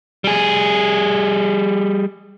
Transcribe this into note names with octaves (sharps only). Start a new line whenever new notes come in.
G3 G#4